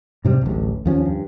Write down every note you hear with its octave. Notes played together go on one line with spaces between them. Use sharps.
G#2 C3 D#3 G3
D1 A1
D#2 F3 C#4
G2